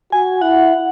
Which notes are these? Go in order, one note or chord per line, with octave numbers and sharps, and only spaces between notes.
F#4 G#5
E4 F#5